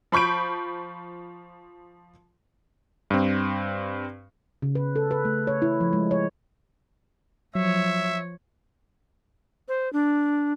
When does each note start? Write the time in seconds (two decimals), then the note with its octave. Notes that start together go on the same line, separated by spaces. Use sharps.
0.12 F3 B5 C#6 G6 D7
3.10 G2 C4
4.62 C#3
4.75 B4
4.96 A4
5.11 B4
5.25 A3
5.47 C#5
5.62 E4
5.80 F3
5.93 G#3
6.11 C#5
7.55 F3 F#3 C#5 E5
9.68 C5
9.93 D4